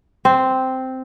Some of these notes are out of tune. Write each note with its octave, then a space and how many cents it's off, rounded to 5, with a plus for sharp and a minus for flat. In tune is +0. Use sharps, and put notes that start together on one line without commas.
C4 -5